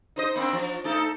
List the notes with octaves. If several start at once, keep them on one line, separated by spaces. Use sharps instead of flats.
D#4 C5 D#5
A#3 C4 D4
F3
A3 D#4 A4